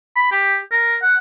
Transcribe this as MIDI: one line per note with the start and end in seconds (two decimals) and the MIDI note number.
0.16 0.27 83
0.32 0.58 67
0.71 0.96 70
1.02 1.16 78